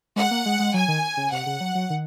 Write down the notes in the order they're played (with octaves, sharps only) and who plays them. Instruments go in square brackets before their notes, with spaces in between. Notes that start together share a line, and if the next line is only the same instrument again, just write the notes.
[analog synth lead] G#3 [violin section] F#5
[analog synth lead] A#3
G#3
G#3
[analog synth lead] F#3 [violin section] G#5
[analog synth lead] D#3
C#3
[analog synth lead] C3 [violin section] F#5
[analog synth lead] C#3
F#3
F#3
D#3